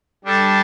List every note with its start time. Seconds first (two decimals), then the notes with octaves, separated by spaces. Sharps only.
0.25 G3 D4 A4